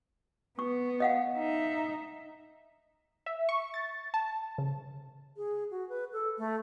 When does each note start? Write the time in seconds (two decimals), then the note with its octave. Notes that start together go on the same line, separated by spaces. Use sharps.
0.59 B3 C#6
1.00 D#5 F5 F#5
1.37 D#4 E5
3.26 E5
3.49 C#6
3.74 A6
4.14 A5
4.58 C#3
5.37 G#4
5.71 F#4
5.89 B4
6.13 A4
6.38 A3